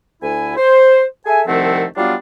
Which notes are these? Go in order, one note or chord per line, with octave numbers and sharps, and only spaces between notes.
D2 E4 G#5
C5
G#4 A4 E5 G#5
C2 D#3 F3 A3 C4 F#5
F#3 G3 B3 D4 F4